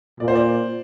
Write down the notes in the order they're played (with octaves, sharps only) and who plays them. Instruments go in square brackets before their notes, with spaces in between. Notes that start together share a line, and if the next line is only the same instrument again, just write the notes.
[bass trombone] A#2 [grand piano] D5
[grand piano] C5
D5